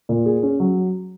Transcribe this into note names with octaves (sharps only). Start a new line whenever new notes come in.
A#2
G#4
C#4
F#3